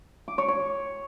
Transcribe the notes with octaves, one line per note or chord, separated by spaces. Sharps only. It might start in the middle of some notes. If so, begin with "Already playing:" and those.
D6
C#5
C#5